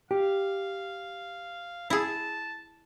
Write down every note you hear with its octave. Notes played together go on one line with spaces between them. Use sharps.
G4 F5
E4 G#4 A5